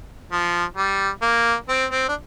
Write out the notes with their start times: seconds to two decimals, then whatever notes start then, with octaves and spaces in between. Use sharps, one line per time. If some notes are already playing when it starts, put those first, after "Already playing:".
0.32 F3
0.77 G3
1.22 A#3
1.69 C4
1.91 C4
2.09 D4